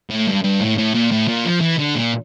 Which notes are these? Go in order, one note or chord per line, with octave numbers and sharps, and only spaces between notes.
A2
G2
G2
A2
A2
A#2
A2
A#2
F3
E3
D3
A#2